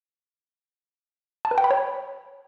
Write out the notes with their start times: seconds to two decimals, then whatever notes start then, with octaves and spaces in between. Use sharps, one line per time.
1.45 A5
1.51 B4
1.58 G5
1.64 B5
1.71 C#5